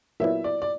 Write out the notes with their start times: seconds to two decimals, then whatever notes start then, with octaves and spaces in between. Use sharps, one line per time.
0.20 A#2 F#3 B3 E4 E5
0.44 D5
0.62 D5